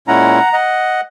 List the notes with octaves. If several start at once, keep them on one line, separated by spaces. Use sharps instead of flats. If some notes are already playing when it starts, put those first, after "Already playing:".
A#2 G#3 C#4 E4 F#5 A#5
D#5 F#5